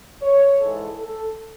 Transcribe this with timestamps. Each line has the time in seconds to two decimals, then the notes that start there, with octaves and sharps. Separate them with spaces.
0.21 C#5
0.58 G#2 E3 G#3 A4
0.96 A4